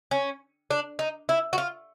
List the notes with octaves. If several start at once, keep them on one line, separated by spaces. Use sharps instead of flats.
C#4
D4
D#4
E4
F#4
F4